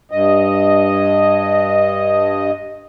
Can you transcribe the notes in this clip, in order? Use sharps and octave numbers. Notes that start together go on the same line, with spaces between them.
G2 D#5